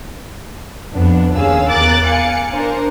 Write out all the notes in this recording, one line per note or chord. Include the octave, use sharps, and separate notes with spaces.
F2 B3 D4
D#2 C#4 G#4 F5 E6
E2 A#4 D6 F#6 A6
F5 G#5 C#7
D4 A#4 C5